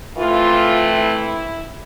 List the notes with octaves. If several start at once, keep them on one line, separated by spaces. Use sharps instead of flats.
E3 A3 C4 F4
E4